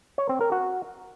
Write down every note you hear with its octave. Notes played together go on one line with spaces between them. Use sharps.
C#5
C4
A#4
F#4